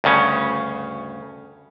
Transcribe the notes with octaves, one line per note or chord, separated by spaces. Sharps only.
D2 G2 C#3 C#4